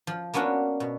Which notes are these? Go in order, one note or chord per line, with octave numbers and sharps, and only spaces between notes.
F3
A#3 B3 C#4 D4 F#4
B2